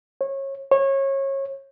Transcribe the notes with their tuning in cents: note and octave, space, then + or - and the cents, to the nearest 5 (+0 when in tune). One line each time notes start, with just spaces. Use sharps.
C#5 -25
C#5 -25